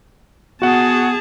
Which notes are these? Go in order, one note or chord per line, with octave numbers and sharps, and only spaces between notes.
B3 F#4 G#4 F#5 A5